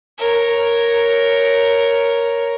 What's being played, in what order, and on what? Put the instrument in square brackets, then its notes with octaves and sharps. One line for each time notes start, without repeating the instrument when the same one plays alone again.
[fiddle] A#4 C#5